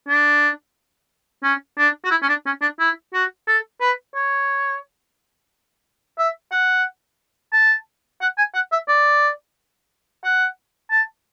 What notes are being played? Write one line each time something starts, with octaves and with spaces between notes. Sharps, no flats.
D4
C#4
D4
F#4
E4
C#4
D4
C#4
D4
E4
F#4
A4
B4
C#5
E5
F#5
A5
F#5
G#5
F#5
E5
D5
F#5
A5